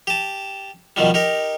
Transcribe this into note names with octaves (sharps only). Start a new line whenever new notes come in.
G4 A5
B2 D#3 F3 G3
D#4 G4 A#4